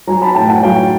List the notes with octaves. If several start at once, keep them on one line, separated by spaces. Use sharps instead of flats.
F#3 G#5 A#5
A5 B5
A2 G5 A5
F#5 G#5
F#3 F5 G5